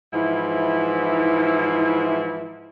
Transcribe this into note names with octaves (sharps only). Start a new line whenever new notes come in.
G#2 E3 F3 E4